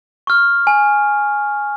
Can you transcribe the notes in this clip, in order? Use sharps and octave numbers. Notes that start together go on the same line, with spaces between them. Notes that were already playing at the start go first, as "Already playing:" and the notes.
C#6 F6
G#5